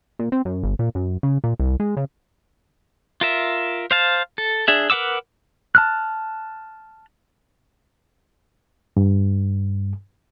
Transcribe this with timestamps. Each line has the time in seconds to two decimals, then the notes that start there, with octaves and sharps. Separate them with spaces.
0.19 A#2
0.32 C4
0.45 F#2
0.63 G1
0.79 A#2
0.95 F#2
1.23 C#3
1.44 A#2
1.59 C2
1.80 G#3
1.97 C#3
3.21 F4 A#4 E5
3.91 C5 F5 A5
4.38 A4
4.68 D4 G#4 E5
4.90 A#4 B4 F#5 D6 E6
5.75 A5 F6 F#6
8.97 G2